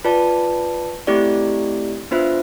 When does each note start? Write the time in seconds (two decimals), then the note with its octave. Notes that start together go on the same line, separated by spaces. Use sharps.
0.04 F4 B4 D5 A5
1.07 A3 C4 E4 G4 D5
2.11 B3 D4 F4 C5 E5